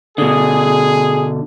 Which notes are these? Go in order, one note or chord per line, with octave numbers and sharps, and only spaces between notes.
B2 D3 G#4